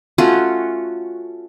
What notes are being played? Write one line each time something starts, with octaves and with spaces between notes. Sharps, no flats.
A3 C#4 F4 F#4